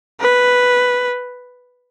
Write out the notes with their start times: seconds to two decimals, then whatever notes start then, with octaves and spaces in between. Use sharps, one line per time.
0.21 B4